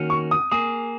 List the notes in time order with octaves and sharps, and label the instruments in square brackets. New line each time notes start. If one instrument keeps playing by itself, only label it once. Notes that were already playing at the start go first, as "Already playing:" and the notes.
Already playing: [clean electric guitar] D#3 A#3 C#4 F#4
[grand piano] C#6
D#6
[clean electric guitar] A#3 G#4 [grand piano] D#6